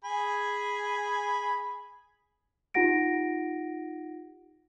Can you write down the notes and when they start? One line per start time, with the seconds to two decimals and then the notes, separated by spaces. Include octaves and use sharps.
0.04 G#4 G#5 B5
2.74 D#4 F4 G4 F#5 A#6 D7